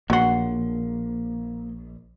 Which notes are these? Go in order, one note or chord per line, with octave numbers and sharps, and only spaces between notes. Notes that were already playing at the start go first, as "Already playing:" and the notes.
A#1 F#3 A#3 F#4 C6